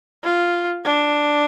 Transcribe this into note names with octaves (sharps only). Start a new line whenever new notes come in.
F4
D4